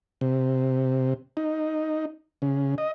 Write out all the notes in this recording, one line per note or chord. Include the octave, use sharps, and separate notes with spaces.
C3
D#4
C#3
D#5